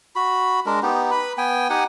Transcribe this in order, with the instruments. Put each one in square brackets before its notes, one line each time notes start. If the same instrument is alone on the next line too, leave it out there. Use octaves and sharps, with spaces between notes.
[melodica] F#4 B5
G#3 D4 A#4
B3 D#4 G4
B4 B5
B3 G5 G#5
D#4 G4 F#5 G#5